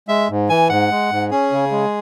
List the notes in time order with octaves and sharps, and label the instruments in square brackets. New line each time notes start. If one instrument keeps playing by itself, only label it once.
[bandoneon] G#3 [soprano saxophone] E5
[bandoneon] G#2
[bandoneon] E3 [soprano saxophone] G#5
[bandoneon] G#2 [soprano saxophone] F#5
[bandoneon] G#3
G#2
[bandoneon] C#4 [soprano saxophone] G#4
[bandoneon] C#3
G#3